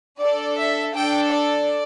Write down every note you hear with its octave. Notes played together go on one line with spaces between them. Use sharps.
D4 A4 D5
E5
D4 A4 G5
D5